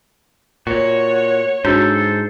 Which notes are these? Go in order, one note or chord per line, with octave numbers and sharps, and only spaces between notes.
A#2 F#4 C#5
G#2 D4 F#4 A4 C5